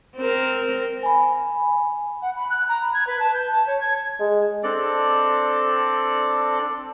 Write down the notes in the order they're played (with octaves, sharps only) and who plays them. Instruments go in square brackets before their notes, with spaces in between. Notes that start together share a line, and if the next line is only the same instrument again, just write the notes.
[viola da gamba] C4 A#4
[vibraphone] G#5 B5
[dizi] F#5
B5
F#6
A#5
B5
G#6
B4
A5
G6
A5
C#5
G#6
[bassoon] G#3
[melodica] C4 D4 A4 D5